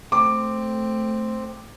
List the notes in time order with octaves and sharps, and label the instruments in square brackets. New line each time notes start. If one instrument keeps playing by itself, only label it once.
[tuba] A3 [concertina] C4 [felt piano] D6